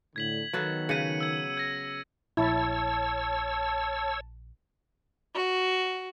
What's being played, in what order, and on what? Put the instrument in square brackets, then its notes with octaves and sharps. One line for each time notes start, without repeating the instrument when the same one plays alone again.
[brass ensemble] A2 D3 [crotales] G#6 B6 F#7
[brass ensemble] D#3 [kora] F#3 B3 A4
[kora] C#3 F#5 [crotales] C#7 D#7
[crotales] E6 G#6
G#6 A#6
[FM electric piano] A#1 [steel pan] E4 [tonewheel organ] C#5 E6 [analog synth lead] A5
[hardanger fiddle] F#4